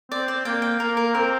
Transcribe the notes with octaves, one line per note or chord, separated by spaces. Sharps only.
C4 D5
D5
A#3 G5
G5
A#3 A#4
A#4
C4 A#4